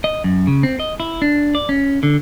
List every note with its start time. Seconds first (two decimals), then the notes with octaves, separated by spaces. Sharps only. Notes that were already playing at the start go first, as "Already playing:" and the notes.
0.04 D#5
0.24 F#2
0.47 C#3
0.63 C4
0.80 D#5
1.00 E4
1.22 D4
1.55 D5
1.69 C#4
2.03 D3